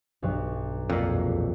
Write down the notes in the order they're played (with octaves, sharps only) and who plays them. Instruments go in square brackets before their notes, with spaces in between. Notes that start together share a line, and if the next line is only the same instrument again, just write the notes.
[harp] B1 G2 F#3
[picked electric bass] F2 A#2 [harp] D#5
[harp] E1